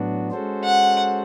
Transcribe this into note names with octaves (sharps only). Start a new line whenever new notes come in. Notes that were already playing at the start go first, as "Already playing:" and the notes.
Already playing: A2 F#3 B3 D4 F#4
G#3 C#4 F#4 A4 C5
F#5